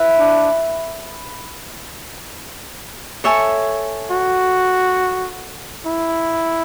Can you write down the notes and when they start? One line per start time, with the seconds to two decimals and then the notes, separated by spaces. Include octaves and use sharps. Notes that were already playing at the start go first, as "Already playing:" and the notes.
Already playing: E4 B4 E5
0.19 D4
3.24 A4 C#5 E5 G#5
4.11 F#4
5.86 E4